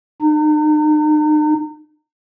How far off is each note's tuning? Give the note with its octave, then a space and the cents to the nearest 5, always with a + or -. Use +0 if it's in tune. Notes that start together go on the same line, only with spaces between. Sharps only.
D#4 -40